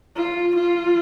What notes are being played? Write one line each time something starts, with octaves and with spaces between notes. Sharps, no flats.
F4
F4